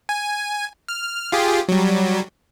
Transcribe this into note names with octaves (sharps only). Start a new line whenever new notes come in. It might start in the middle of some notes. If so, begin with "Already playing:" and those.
G#5
F6
F4 G4 G#4
F#3 G3